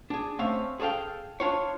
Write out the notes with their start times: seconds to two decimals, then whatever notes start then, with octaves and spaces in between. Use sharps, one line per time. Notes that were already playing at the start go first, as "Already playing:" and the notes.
0.10 D4 G#4
0.39 A3 C4 C#4 E5 F5
0.80 G#4 A4 C#5 F5 G5
1.40 D4 F4 C#5